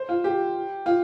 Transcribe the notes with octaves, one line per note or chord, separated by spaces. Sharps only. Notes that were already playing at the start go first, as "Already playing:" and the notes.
Already playing: C5
F4
G4
F4